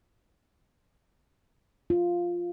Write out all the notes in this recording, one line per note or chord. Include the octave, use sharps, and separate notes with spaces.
F4